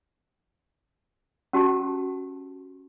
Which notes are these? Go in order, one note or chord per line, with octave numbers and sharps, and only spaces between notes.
C#4 F#4 G4 A5